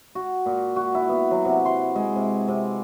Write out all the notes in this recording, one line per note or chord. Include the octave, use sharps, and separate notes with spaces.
F#4
A#2
F#4
E4
B3
F#3
C3
C6
G#3
C3
C3